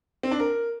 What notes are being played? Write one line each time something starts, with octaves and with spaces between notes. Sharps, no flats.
C4
D4
A#4